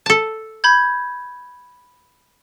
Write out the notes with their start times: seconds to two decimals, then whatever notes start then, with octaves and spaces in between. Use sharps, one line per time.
0.06 A4 A5
0.64 B5 G6 G#6